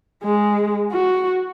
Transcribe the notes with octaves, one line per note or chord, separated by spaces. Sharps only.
G#3
F#4